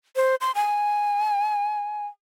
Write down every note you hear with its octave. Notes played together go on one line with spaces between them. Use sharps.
C5
C6
G#5